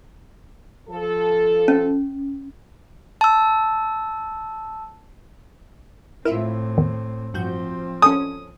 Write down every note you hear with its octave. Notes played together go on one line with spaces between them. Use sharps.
F3 A4
C#4
A5 E6
A2 C4 E4 F4 A#4 E5
E2 D#3
G2 F3 C4 F#4 G6
C#4 A4 G#5 A5 D#6